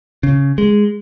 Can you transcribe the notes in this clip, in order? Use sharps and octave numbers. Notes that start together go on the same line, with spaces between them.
C#3
G#3